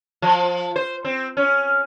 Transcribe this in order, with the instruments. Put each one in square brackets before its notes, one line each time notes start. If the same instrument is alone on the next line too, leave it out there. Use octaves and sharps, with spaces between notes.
[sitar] F3
C5
C4
C#4